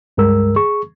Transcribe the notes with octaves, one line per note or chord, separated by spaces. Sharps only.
C#2 G2 G#3 A#4 E6
G#4 C#6